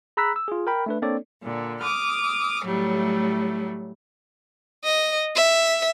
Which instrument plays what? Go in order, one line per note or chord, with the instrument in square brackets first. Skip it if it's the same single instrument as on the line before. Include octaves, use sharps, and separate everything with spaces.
[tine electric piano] G#4 A#5 B5 E6 F#6 B6
E6
F4 G#4
A#4 G5 B5
A3 D4 B4
A#3 C4 D4 A4 C#5 D5
[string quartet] A#2 D3
D6 D#6 F6
A2 F#3 G3 A3
[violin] D#5
E5